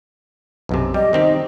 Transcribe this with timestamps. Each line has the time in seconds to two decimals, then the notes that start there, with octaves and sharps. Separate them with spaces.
0.69 B1 F#2 C3
0.94 G3 G4 D#5
1.13 D#3 C4 D#4 G4